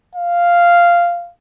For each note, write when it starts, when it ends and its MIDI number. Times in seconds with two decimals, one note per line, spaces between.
0.15 1.31 77